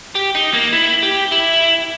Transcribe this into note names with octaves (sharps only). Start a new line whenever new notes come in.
G4
D#4
A#3
E4
G4
E4